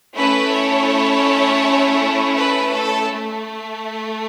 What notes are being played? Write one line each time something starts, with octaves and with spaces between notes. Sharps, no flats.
A3 C#4 E4 A4 B4
C#5
B4
A4
A3